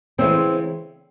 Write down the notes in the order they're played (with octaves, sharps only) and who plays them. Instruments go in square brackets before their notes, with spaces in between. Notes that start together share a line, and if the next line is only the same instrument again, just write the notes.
[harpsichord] C#3 E3 G#3 [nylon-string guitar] C4